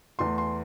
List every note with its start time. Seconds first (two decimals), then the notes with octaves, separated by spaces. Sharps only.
0.19 E2 E3 A3 C6
0.38 C6